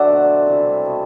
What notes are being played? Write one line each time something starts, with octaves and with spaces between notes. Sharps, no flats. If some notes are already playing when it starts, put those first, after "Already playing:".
Already playing: D3 F#3 C5 D5 E5 F#5
B2 A3
C3 E3 G3
B2 A3